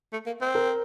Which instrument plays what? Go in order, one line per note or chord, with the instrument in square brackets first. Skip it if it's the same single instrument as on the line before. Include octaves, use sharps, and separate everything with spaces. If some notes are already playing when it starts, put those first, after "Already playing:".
[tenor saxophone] A3
A#3
C4
[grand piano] A#4